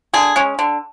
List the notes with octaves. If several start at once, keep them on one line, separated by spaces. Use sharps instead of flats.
D3 G#4
G#3 C#4
D3